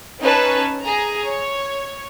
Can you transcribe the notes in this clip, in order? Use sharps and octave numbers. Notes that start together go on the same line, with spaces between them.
C#4 D#4 B4 C#5 A5
G#4 A#5
C#5